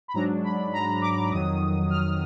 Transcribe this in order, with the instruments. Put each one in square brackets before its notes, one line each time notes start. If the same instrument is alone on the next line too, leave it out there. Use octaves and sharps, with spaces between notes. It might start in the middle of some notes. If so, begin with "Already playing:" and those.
[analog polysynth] B5
G#2 F#3 D4 A#5
B5
A#5
D6
F2 D#3 F#3 D#6
F6